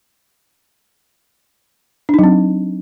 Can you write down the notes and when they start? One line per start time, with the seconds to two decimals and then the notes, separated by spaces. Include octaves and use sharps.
2.09 D4
2.14 D#4
2.19 F#3
2.24 C4